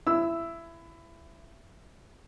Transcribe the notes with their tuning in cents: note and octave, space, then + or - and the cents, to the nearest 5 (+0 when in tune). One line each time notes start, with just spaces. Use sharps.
E4 +20 E6 +0